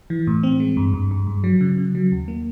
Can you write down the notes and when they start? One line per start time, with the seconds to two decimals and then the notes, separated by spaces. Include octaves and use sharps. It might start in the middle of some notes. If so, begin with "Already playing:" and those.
0.10 E3
0.27 A2
0.43 C4
0.60 G#3
0.77 G2
0.94 G2
1.11 G2
1.27 G2
1.44 F#3
1.61 C#3
1.78 C#3
1.95 F#3
2.12 D#2
2.28 A#3